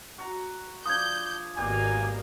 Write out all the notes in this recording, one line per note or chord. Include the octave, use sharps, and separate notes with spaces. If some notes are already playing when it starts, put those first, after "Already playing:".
F#4 F#5 A#5
F3 D4 D#6 G6 G#6
G#1 B2 G3 A#3 G4 G#5